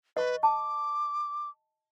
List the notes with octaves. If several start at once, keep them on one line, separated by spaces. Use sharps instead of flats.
B4 D#5 C#6
A5 D6